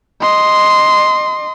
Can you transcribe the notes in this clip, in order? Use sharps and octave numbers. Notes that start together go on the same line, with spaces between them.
D#5 C6